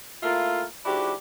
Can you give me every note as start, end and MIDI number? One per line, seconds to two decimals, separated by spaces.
0.23 0.63 57
0.23 0.63 58
0.23 0.63 64
0.23 0.63 65
0.85 1.13 44
0.85 1.13 52
0.85 1.13 62
0.85 1.13 64
0.85 1.13 66
0.85 1.13 67